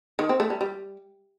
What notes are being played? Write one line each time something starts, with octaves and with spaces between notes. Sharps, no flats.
D#3
C4
A3
G3
G3